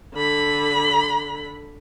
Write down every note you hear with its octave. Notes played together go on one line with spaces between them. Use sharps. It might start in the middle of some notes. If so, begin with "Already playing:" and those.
D3 B5